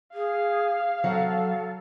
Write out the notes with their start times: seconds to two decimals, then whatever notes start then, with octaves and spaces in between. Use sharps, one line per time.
0.14 G#4 F5
1.04 F#3 A4